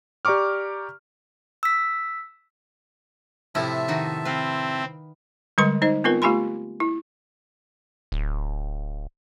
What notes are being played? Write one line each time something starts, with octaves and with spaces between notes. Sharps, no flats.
G4 D5 A#5 C#6 D6 F6
E6 B6
A2 C3 F3 E4 E5 A5
D#3 D#4 F#4
C4 B4 F5
D3 G3 G#3 B4 C6 C#6
D#4 C5 D#5
B3 C4 F4 A#4 B4
A3 F4 G4 G#5 B5 C6
E4
D1